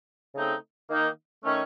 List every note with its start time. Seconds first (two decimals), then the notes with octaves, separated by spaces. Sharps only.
0.35 C#3 A3 C4 D#4
0.89 D#3 A#3 D#4
1.43 D#3 A3 C#4